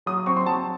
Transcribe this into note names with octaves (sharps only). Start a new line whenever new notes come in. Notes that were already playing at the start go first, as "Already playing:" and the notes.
F#3 D#6
C4 C#6
C6
F#3 A5